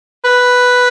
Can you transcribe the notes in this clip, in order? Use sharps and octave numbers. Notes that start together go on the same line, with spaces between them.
B4